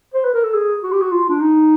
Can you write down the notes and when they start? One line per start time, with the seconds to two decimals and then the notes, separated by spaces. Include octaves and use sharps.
0.14 C5
0.24 B4
0.34 A#4
0.43 A4
0.54 G#4
0.83 F#4
0.92 G4
1.02 F#4
1.12 F4
1.29 D4
1.41 D#4